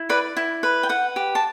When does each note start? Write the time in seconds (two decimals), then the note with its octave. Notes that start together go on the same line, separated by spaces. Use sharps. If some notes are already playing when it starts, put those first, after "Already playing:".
Already playing: E4
0.09 B4 D5 B5
0.37 E4
0.63 B4
0.83 G5
0.89 B4 F#5
1.16 G4
1.35 A5